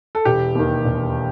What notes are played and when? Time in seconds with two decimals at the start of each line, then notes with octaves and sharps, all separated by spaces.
0.15 A4
0.25 E1 G4
0.55 D#2 D#3
0.85 E1